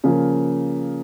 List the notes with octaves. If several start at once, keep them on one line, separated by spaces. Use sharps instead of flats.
C#3 F3 A#3